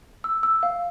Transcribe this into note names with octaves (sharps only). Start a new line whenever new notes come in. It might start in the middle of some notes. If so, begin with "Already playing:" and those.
E6
E6
F5